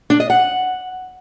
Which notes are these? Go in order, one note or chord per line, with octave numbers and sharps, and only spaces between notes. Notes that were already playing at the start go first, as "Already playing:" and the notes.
D4
D#5
F#5